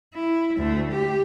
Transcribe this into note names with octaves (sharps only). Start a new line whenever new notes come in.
E4
D2 A3
G4